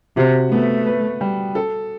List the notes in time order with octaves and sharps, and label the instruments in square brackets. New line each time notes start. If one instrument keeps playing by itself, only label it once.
[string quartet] C3 [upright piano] F#4
[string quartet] A3 [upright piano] B3
[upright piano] B4
G3
A4